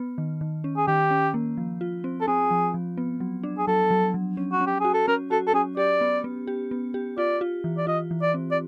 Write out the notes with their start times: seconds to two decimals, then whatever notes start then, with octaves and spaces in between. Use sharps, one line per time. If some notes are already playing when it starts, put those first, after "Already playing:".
Already playing: B3
0.18 D#3
0.41 D#3
0.64 C#4
0.77 G#4
0.87 D#3 G4
1.11 C#4
1.34 A#3
1.57 F3
1.81 F4
2.04 C4
2.21 A4
2.28 C4 G#4
2.51 F3
2.74 F3
2.98 B3
3.20 F#3
3.43 D4
3.58 G#4
3.67 F#3 A4
3.91 F#3
4.14 F#3
4.37 C#4
4.52 F#4
4.61 C#4
4.67 G4
4.80 F#4 G#4
4.94 A4
5.08 C#4 A#4
5.31 F#4 A4
5.47 A4
5.53 C#4 G#4
5.77 G4 D5
6.01 B3
6.24 B3
6.47 G4
6.71 B3
6.94 G4
7.18 F4 D5
7.41 F4
7.64 E3
7.77 D5
7.87 F4 D#5
8.11 E3
8.22 D5
8.34 C4
8.51 D5